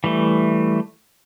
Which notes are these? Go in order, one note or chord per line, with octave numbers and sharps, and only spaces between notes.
E3 G3 A3